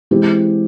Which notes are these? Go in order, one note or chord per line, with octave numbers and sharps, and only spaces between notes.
E3 G#3 C4 E4 G4